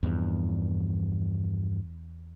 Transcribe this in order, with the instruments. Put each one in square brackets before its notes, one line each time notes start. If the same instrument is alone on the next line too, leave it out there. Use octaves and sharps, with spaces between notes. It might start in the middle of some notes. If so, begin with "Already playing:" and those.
[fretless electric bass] E2 [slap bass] G2 E3 F3